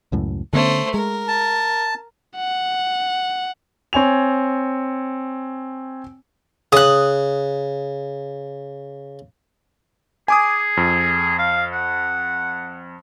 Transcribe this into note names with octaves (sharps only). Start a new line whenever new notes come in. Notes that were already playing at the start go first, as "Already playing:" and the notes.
C#2 F#2 A2
D3 A3 B3 C#4 C5
G#3 A#4
A5
F#5
C4 C#5 G#5 F7
C#3 D#6 F#6
G#4 G#5 D6 D#6
F2
F5
F#5